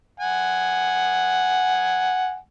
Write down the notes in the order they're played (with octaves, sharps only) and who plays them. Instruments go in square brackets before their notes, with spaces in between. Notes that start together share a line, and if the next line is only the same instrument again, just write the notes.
[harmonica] F#5 G#5